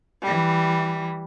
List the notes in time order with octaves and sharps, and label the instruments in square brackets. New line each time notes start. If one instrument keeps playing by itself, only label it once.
[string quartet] E3 G3